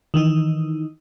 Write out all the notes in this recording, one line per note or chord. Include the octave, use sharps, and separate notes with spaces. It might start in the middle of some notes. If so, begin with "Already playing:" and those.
D#3 E3 D#4